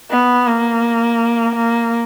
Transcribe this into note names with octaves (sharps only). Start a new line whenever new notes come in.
B3
A#3
A#3